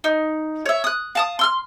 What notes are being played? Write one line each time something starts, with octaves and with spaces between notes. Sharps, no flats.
D#4
C#5 E5
D#6 F#6
F5 A5 D#6
C6 E6 F6